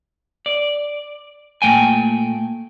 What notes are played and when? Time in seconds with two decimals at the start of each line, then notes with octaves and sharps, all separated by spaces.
0.46 D5
1.62 A#2 D#3 A3 G5 G#5